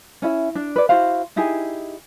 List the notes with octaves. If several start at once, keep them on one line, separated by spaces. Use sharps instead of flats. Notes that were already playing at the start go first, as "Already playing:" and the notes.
C#4 E4 E5
D4
B4 D5
E4 F#4 C5 F5
D#4 E4 G4 G#4